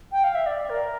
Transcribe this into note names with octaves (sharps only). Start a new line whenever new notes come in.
G5
F5
E5
D5
A#4